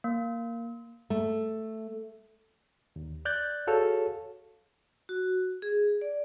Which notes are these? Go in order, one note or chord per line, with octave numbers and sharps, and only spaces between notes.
A#3
A3
D#2
D5 F#6 G6 A6
F#4 G#4 A4 C#5 F5
F#4
G#4
D5